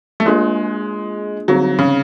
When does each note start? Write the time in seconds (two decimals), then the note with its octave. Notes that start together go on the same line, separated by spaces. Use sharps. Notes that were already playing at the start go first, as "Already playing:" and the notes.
0.20 A3
0.26 G#3 A#3 D4 F4 G#4
1.48 D3 F#3 G3 C4 D#4 G#4
1.79 C#3